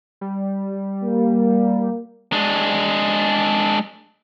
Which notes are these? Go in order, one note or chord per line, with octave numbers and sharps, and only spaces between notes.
G3
A#3
G#3 D4